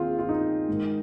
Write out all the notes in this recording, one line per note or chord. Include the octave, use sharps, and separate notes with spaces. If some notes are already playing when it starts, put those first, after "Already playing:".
Already playing: D#2 D#3 C4 F4 G#4
F4
D#4
G#2 D#3